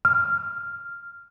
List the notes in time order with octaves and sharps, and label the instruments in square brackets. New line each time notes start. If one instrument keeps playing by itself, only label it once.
[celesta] F6